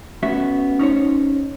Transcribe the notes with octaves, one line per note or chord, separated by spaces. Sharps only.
A3 B3 C#4 F#4 E5
C#4 D#4 C5 C#5